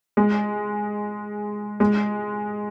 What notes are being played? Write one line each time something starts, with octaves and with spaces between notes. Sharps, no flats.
G#3
G#3